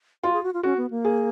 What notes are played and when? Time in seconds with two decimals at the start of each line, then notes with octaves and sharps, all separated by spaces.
0.23 F4 F#4
0.33 G#4
0.43 F#4
0.54 F4
0.63 C#4 F#4
0.77 B3
0.90 A#3
1.05 G#4